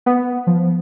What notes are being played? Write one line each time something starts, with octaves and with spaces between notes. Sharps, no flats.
B3
F3